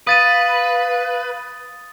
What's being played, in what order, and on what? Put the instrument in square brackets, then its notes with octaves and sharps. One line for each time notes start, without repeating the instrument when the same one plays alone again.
[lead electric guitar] B4 [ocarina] F5 [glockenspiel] D#6 A6 D#7